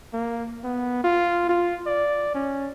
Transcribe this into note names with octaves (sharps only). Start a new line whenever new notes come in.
A#3
B3
F4
F4
D5
C#4